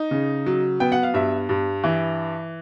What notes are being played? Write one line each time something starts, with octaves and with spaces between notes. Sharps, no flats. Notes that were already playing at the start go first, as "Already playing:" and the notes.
Already playing: D#4
C#3
F#3
B3 G5
F#5
F5
G2 E5
G2
E3